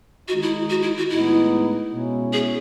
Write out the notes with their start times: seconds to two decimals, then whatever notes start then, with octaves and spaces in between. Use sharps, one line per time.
0.28 D#3 G#3 D#4 F#4
0.42 E4
0.69 F#4
0.82 E4
0.97 F#4
1.10 A2 G#3 B3 D#4 E4
1.92 B2 G#3 C#4 E4
2.33 G#4